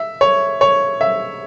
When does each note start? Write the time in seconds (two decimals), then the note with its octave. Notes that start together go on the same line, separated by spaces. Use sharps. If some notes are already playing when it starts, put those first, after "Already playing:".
Already playing: E5
0.21 C#5
0.61 C#5
1.01 E5